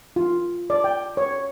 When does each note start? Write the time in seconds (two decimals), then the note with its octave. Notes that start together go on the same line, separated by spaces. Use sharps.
0.16 F4
0.70 D5
0.84 G5
1.17 C#5